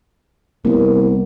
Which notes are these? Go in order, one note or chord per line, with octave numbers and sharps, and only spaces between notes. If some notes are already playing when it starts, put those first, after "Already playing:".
C2 A#3 B3